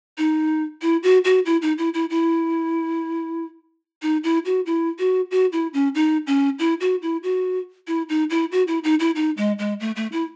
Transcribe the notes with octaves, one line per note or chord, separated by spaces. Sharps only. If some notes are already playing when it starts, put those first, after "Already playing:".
D#4
E4
F#4
F#4
E4
D#4
E4
E4
E4
D#4
E4
F#4
E4
F#4
F#4
E4
C#4
D#4
C#4
E4
F#4
E4
F#4
E4
D#4
E4
F#4
E4
D#4
E4
D#4
G#3
G#3
A3
A3
E4